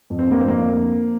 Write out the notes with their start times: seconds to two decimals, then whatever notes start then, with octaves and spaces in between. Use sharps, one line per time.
0.10 F2
0.19 C4
0.27 D3 A#3
0.40 C4
0.44 F2 A#3
0.60 D3